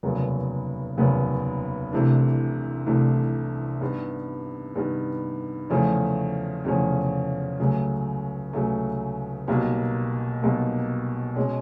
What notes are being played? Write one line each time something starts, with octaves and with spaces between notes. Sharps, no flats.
F1 D#2 C#3 F#3 B3
F1 D#2 C#3 F#3 B3
C2 C3 E3 A3 D4
C2 C3 E3 A3 D4
G2 D#3 G3 B3
G2 D#3 G3 B3
E2 C#3 F3 A3 C#4
E2 C#3 F3 A3 C#4
C#2 C#3 F#3 A3
C#2 C#3 F#3 A3
B1 B2 G3 A#3
B1 B2 G3 A#3
B2 G#3 C#4